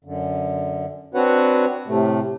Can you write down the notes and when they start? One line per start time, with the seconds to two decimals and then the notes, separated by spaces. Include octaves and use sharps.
0.05 F#2 D3
1.14 C4 D4 F#4 B4 C#5 F#5
1.87 A2 C3 A3